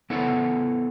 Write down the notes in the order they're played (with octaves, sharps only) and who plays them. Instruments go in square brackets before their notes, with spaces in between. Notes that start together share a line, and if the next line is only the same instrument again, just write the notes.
[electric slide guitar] B3 E4 A4 C#5 F#5